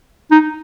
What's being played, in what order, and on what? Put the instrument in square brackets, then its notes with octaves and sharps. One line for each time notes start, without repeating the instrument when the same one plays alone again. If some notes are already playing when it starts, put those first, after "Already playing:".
[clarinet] D#4